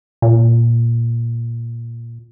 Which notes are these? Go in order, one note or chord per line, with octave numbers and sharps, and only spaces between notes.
A#2